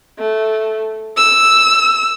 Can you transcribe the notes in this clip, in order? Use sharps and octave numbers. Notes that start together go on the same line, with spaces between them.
A3
E6